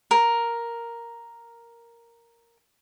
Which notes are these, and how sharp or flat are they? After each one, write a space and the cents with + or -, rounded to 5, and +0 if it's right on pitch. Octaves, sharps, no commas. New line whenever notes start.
A#4 +0